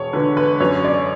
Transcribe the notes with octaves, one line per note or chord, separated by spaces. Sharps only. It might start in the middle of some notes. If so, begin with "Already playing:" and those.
Already playing: E1 C#5
D3 B4
B4
F#2 C#5
D5